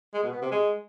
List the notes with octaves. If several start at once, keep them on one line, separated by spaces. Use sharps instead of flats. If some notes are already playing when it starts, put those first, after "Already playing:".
G#3
B2
B3
C3
G#3